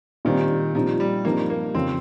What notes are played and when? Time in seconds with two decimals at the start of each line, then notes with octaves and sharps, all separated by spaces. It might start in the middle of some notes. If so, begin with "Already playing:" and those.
0.25 A#2 D#3 G3 C4
0.75 A#2 F3 G3 C4 D#4
1.00 G3
1.24 G2 F3 A#3 C4 D#4
1.50 A#3
1.75 F2 C#3 F3 C4